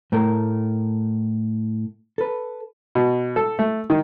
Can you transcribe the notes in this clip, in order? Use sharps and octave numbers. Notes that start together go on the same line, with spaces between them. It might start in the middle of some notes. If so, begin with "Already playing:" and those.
A2 A3 A#4
A4 B4
B2
A4
A3
D#3